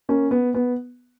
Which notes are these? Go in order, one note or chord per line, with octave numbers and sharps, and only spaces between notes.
A#3 C#4
B3
B3